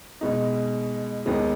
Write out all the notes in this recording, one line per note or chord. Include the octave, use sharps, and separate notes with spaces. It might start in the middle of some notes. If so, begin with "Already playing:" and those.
B2 G#3 D#4
D#2 D#3 G#3 B3